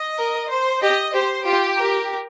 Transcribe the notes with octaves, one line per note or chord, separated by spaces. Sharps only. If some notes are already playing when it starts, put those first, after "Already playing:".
Already playing: D#5
A#4
C5
G4 D#5
G4 C5
F4 G4
A#4